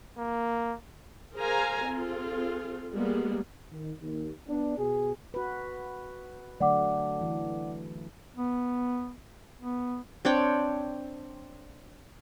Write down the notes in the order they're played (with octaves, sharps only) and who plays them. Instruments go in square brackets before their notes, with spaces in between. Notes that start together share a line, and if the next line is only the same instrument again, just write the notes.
[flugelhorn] A#3
[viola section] G#4 A#4 C5 F5 G#5 A#5
C4 F4 G#4 A4
G3 G#3 A#3 B3
[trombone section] D#3
D#2
B3 D4
B2 G#4
[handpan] F#4 B4
[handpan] D3 F#3 A3 [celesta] D5 F#5 D6
[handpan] E3
[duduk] B3
B3
[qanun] C4 D4 C#5 G5